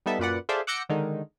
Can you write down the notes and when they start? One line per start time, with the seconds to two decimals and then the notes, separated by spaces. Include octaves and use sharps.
0.06 G3 B3 D#4 A4 E5
0.19 F#2 A#2 B4 D5 F#5
0.49 F4 G#4 A4 C5 D5 E5
0.67 F#5 D6 E6 G6 A#6 C#7
0.89 D3 D#3 G#3 D#4